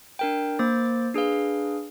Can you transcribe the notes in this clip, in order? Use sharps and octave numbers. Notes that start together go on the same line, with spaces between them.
D4 A#4 G5
A#3 C5 D6 A6
D4 G#4 B4 F5